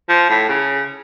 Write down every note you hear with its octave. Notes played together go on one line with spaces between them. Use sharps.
F3
A2
C#3